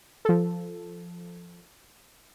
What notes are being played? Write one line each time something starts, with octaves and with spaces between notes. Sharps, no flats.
F3 A4